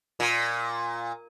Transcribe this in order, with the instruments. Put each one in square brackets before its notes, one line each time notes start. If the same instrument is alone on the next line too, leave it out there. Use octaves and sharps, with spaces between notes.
[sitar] A#2